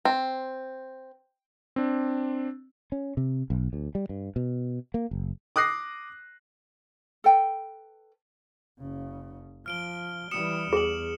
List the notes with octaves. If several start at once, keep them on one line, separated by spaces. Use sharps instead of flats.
C4
C4 D4
C#4
C3
B1
D2
G3
G2
B2
A#3
F#1
D6 D#6 F#6 A#6 C7
A4 B4 G5
F#1 C#3
F3 F6 D7 G7
E3 G3 D#6 C#7 E7
E2 G#4 E7 F#7